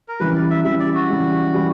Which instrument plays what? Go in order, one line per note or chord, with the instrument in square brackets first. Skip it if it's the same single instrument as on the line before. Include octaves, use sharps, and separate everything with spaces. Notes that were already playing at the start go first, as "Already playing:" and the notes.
[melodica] A#4
[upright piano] C#3 E3 G3 [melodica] B4
[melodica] D5
E5
[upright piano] C#3 E3 G3 [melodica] E5
[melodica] D5
F#4
[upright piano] C#3 E3 G3
E3 G3